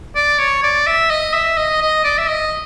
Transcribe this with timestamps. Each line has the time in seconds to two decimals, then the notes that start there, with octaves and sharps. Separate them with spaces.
0.15 D5
0.39 C#5
0.63 D5
0.87 E5
1.10 D#5
1.34 E5
1.58 D#5
1.82 D#5
2.04 D5
2.18 E5
2.29 D#5